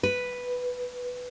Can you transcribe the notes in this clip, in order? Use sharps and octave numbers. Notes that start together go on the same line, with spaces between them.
B4